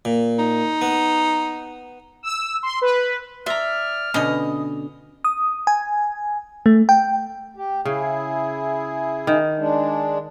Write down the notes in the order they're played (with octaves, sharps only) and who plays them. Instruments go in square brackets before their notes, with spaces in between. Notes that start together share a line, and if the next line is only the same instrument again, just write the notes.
[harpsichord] A#2
[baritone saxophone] D#4
[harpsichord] B3
[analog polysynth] E6
C6
B4
[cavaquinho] D5 E5 [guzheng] A#5 C6 [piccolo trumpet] F6
[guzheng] B2 D3 C#4 [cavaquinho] D#5
[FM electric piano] D#6
G#5
A3
G5
[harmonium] G4
[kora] C#3 [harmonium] E4 G#4
[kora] D#3
[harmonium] G#3 D4